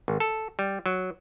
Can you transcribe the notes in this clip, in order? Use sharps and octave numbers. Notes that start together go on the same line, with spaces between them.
G#1
A4
G3
F#3